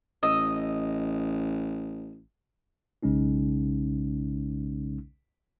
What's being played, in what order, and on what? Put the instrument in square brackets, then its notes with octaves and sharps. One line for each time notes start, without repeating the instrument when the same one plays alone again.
[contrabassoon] A1 [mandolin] D#5 E6
[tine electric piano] B1 C#3 G#3 C#4 D#4